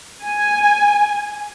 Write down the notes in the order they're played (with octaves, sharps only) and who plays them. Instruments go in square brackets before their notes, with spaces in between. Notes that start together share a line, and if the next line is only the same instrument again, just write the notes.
[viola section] G#5